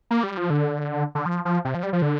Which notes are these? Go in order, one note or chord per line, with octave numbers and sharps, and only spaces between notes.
A#3
G3
F3
D3
D3
F3
F3
C3
F3
G3
F3
D3